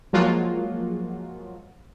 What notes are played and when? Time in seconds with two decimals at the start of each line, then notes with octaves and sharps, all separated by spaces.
0.13 F3 F#3 G#3 A#3 F4 F#4